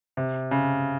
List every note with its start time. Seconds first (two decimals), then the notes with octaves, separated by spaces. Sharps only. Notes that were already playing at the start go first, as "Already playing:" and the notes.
0.17 C3
0.51 C#3